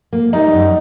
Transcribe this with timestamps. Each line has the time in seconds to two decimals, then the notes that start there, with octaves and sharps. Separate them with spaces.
0.13 A#3
0.33 G3 D#4
0.54 F#2